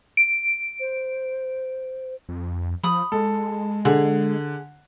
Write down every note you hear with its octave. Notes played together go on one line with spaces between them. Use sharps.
D7
C5
F2
F3 B5 D#6
G#3 A4
D3 G#4